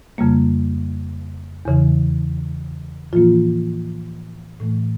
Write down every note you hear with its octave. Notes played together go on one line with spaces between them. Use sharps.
F2 C#3 G3 A#3
E2 C#3 E3
A2 E3 F3 A#3 F4
A2 E3 A3